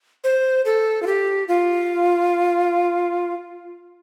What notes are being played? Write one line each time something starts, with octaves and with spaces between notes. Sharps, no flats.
C5
A4
F4
G4
F4